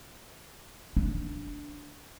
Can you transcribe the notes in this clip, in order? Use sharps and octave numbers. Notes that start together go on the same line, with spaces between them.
D4